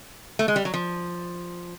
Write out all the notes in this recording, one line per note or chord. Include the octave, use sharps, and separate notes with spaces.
A3
G#3
G3
F#3
F3